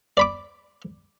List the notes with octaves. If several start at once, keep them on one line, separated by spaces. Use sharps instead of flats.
D5 B5 D6